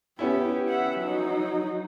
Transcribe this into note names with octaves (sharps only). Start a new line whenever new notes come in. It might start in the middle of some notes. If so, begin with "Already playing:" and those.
B3 C#4 E4 G4
E5 F#5
F#3 D#4